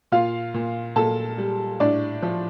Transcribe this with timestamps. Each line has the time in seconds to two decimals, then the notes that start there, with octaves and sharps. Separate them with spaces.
0.12 A#2 F4 F5
0.54 A#2
0.96 A#2 A4 A5
1.38 G3
1.80 A2 D4 D5
2.22 F3